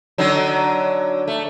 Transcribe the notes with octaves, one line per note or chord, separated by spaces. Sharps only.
D3 F#3 D#4
A3